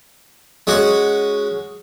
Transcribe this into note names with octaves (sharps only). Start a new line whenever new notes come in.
G#3 C#4 F#4